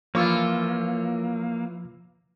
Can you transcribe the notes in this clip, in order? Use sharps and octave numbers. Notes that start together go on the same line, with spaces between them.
E3 F3 A#3 F4 C#5 D6 E6